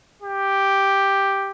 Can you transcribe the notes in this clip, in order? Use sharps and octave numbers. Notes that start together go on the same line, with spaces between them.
G4